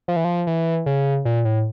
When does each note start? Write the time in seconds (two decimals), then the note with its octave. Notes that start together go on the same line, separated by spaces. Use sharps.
0.08 F3
0.16 E3
0.24 F3
0.47 E3
0.86 C#3
1.25 A#2
1.45 A2